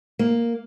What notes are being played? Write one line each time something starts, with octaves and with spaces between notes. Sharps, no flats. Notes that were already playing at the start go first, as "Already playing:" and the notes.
A#3